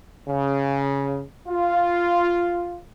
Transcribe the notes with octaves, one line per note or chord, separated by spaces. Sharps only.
C#3
F4